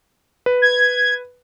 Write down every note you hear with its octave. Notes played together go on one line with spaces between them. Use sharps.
B4
G#6